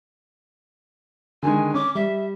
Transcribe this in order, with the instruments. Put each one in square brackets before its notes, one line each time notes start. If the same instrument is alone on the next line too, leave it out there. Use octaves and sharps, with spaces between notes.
[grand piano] D3 D#3 G#3 [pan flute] G#5
[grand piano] C#4 [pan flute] D6
[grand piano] G3 [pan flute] E5